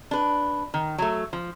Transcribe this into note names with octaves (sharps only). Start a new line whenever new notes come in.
D4 B4
D#3
F#3 A3
F3